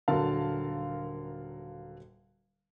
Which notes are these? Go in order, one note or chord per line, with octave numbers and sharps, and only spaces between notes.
D#1 D3 F#3 A#4 F5 A5